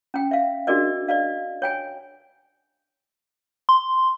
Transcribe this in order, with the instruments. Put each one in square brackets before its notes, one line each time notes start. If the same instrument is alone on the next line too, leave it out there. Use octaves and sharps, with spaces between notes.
[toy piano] C#4 G5
E5 F5
D4 F#4 G#4 A#4 D5 D#5
D5 D#5 F5
C#5 G5 G#5
[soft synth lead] C6